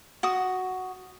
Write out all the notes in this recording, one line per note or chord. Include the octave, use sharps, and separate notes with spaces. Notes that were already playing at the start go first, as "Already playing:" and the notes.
F#4 D#6